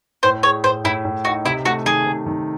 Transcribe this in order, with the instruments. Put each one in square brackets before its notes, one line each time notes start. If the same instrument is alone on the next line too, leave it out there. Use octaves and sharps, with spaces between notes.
[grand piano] A2 [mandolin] C5
[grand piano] G#4 [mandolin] C#5
[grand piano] A2 [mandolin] C5
[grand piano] A2 [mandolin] E4
[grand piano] A2
[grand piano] D#4 [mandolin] F#4
[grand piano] C3 [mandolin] E4
[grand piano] A3 [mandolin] F#4
[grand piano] D#3 [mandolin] G#4
[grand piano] C3
D#3